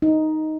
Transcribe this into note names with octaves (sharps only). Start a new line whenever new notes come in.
D#4